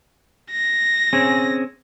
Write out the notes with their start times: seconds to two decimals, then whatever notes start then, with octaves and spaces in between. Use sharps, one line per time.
0.52 A#6
1.13 C4 C#4 G#4